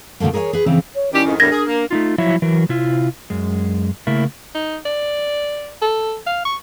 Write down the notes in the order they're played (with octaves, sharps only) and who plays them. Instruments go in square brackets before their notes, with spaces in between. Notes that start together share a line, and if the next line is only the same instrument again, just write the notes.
[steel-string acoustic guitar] B2 D3 F#3 A3 A#3
G#4 A#4 C#5 D#5 G#5
G#4 B4
F2 C#3 E3 C4 C#4
[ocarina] C#5
[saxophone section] D#3 G3 G4 [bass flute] C#4 [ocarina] E4
[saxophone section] F2 G#2 D#3
[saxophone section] E2 A2 G3 [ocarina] D4 [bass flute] A#4 [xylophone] G#6 A#6
[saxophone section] G#4
A#3
[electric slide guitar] A3 D#4 F4
F3 F#3 E4 C#5 E5
E3 F#3 A#4
C3 E4 F4
F#2 G#3
C#3 A3 A#3 E4 A#4
[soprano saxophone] D#4
D5
A4
F5
C#6